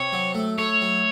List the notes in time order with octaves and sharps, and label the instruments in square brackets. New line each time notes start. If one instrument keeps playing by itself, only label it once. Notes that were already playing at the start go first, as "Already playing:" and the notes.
Already playing: [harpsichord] C3 [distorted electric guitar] C#5
[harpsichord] F#3
A3
[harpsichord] A3 [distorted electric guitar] C#5
[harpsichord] F#3